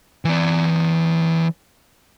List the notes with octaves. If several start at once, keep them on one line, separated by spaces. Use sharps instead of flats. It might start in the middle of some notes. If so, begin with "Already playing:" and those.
E3 D5